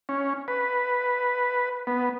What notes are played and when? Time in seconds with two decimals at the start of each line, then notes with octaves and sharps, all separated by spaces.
0.09 C#4
0.48 B4
1.87 B3